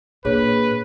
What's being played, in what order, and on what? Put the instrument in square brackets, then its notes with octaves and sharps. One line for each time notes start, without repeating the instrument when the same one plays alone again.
[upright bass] A#2 [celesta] D4 G#4 C#5 [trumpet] B4